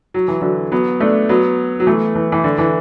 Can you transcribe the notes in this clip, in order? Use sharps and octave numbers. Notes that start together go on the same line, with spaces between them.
F#3
E3
D3 F#3
F#3 B3
A3 D4
F#3 B3
F#3
E3 A3
E3
E3
D3
E3